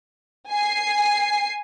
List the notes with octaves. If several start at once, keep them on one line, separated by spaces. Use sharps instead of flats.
G#5 C7